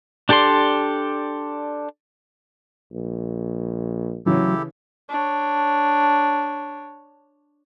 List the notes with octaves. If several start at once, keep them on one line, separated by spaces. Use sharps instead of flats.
D4 G4 A4 D5 C6
A#1
D2 C#3 E3 F#3 E4 G4 A4
D4 C#5